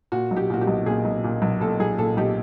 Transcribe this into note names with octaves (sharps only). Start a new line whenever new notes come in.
A#2 F#4
B1
G4
A#2 F#4
G4
B1
A#2 G#4
B1
A#2
B1
A#2 A4
B1 G#4
A#2 A4
B1 G4